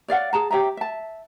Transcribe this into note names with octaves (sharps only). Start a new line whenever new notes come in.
C#5 D5 F5 F#5
G#4 A5 A#5
G4 C#5 E5 A#5
E5 A5